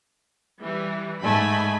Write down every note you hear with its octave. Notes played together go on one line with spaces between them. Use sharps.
E3 G3
G#2 A3 D#5 G#5 B5